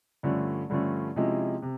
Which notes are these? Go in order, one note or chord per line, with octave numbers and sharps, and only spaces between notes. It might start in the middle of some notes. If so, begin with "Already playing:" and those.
G2 D3 F3 A3 C#4
G2 D3 F3 A3 C#4
C3 F3 G#3 C#4 E4
C3